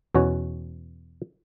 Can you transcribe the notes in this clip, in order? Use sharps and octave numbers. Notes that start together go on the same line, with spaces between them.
E2 B2 C#4 F#4 C#5